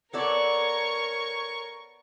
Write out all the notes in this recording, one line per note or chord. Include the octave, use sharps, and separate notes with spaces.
B3 A4 A#4 C#5 D5 C#6